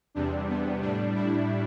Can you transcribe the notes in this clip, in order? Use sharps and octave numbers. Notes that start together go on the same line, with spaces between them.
E2 C3 G3 D4
B3
A2 G3 D4
E4